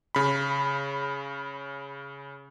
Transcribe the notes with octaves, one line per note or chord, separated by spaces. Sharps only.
C#3 B5